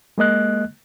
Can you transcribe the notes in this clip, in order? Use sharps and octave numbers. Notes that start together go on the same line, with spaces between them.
G#3 A#3 D#5 F#6